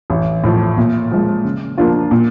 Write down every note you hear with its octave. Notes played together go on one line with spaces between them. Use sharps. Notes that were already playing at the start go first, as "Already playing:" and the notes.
A1
A2 F3
A#2
F3 G#3
C#3
F3 A#3 D4 F4
A#2